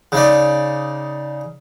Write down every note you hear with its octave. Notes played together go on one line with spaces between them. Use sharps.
C#3 D#4 D5